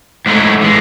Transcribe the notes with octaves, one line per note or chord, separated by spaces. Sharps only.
G#2 F#3 A3 E4
E3 G#3